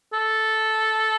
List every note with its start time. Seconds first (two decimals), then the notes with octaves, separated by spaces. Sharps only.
0.13 A4